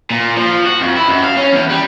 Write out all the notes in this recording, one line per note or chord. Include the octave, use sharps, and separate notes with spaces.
A#2
F3
F#4
F2
E4
F#2
F5
C#4
E2
G3